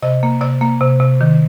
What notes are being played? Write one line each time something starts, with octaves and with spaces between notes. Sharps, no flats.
C3 D#5
A#3
C3 D5
A#3
C3
C3
D#3